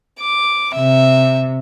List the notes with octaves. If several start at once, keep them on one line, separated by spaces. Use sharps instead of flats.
D6
C3 E5